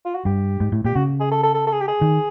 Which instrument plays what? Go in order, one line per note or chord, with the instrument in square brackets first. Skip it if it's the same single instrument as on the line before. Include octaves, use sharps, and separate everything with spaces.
[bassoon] F4
F#4
[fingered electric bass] G2 [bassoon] G4
[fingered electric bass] G#2
A2
[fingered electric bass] A#2 [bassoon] G4
[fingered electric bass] C#3 [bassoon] F#4
[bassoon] G#4
A4
A4
A4
A4
G#4
G4
G#4
[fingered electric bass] D#3